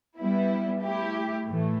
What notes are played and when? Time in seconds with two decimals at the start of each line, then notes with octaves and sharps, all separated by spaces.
0.18 G3 B3 E4
0.81 A3 E4 G4
1.46 A2 E3 A3